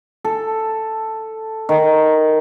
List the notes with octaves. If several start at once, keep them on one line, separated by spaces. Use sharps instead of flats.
A4
D#3